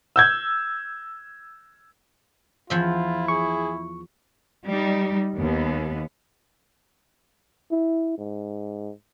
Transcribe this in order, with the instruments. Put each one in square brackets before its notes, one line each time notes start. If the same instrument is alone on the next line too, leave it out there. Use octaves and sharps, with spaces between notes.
[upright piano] E6 G6 G#6
[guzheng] E2 F3 E5 [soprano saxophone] E4 [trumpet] F4
[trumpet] G#4 [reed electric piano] C#6
[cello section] G3 D#4
D#2 B3
[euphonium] E4
G#2